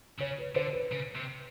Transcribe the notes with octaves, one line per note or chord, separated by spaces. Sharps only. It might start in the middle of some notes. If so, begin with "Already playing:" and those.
C#3 C#5
B4
D3 C5
B4
C#3
C3